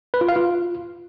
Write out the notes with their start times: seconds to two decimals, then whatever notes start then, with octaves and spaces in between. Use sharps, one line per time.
0.14 B4
0.21 F4
0.29 F5
0.36 F4